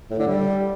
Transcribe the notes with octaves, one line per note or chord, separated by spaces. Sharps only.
A2
D3
G3